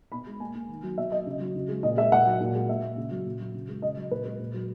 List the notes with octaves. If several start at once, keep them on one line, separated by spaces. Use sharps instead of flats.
B2 B5
G#3
A#3 G#5
A#3
D#3
F#3
B2 E5
F#3 D#5
C#3
F#3
C#3
G#3
A#2 D#5
G#3 E5
A#2 F#5
F#3
A#2
G#3
A#3 E5
A#3
C#3
F#3
A#2
F#3
C#3
G#3
C#3 D#5
F#3
A#2 B4
G#3
A#2
F#3